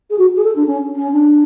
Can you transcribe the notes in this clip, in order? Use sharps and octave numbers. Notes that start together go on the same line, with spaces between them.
G#4
F#4
G#4
A4
D4
C#4
C#4
D4